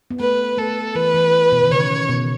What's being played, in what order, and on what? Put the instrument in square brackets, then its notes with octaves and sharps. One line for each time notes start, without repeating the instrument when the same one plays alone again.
[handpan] B3
[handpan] A3 [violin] B4
[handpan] A3 [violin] A4
[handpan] E3 [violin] B4
[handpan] E3
B2
D#3
[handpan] C#3 [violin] C#5
[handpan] B2